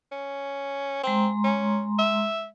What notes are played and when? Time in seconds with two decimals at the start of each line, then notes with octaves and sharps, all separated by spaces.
0.12 C#4
1.04 G#3 C4 A#5 C6
1.44 C#4
1.99 E5